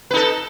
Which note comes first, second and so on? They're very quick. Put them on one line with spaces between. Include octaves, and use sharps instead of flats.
B4 D#4 A4